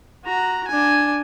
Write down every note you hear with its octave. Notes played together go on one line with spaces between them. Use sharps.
F#4 A#5
D4 G#5